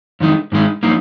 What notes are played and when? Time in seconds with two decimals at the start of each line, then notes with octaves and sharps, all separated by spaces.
0.20 F2 D#3 G#3 D#4
0.52 G#2 D#3 G#3 D#4
0.83 F3 A#3 D#4